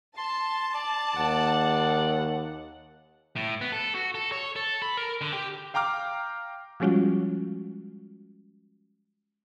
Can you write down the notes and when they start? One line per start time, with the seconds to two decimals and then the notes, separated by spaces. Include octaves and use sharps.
0.17 A5 C6
0.73 D5
1.16 D#2 F#5
3.36 A2
3.61 B3
3.73 A4
3.95 F#4
4.15 A4
4.32 C#5
4.56 A4
4.82 B5
4.97 A#4
5.21 D3
5.33 G4
5.74 F5 G5 A#5 D6 F6
6.80 F3 G3 G#3 C#4 F4 F#4